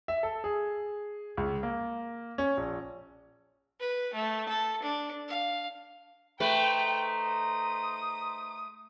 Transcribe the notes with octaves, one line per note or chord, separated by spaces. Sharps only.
E5
A4
G#4
C#2
A#3
C#4
A#1
B4
A3
A4
D4
F5
A3 D#4 B4 C5 G5 A#5
D#6